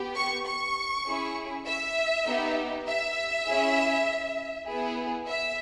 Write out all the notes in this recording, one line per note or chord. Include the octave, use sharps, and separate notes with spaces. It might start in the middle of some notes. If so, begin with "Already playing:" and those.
Already playing: B3 G4
C#6
C#6
C#4 E4 G#4
E5
B3 D#4 G4
E5
C#4 E4 G#4
B3 E4 G#4
E5